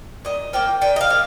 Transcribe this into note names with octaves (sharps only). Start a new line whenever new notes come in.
A#2 D#5
F3 A#3 G5
A#2 G5
D#5
F5
F3 A#3